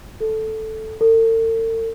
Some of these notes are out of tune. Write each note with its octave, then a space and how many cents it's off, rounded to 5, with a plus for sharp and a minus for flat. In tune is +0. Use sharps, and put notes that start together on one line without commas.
A4 -5
A4 +45